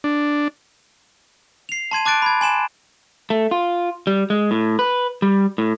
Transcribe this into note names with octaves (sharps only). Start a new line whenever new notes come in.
D4
C7 F7
A5 C6 G#6 D#7
A5 D6 F#6 A6 D7
B5 G#6
G#5 C6 E7
A3
F4
G3
G#3
A2
B4
G3
A2